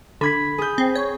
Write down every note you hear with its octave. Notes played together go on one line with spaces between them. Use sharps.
D3 B5 G#6 B6
G#4 G6
C4
C#5